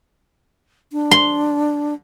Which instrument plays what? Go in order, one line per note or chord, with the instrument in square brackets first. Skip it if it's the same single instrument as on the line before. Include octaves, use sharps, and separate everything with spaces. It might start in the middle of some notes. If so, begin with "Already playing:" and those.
[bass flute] D4
[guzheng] C6